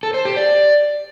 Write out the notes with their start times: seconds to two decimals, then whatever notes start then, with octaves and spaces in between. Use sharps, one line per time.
0.03 A4
0.14 C5
0.25 G4
0.36 D5